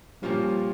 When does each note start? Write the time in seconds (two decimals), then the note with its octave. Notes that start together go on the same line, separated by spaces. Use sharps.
0.22 A#2 F3 G3 A#3 C#4 F4 G4